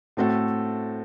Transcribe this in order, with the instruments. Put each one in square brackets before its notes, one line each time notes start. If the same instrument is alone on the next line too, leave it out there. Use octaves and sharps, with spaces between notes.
[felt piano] A2 A3 C4 F#4 A4